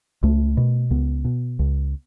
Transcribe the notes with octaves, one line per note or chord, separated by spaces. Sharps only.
C#2 A3
B2
C#2 B3
B2
C#2